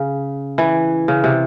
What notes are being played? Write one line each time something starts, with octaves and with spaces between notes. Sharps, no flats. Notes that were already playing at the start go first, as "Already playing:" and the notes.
Already playing: C#3
E3
C#3
C3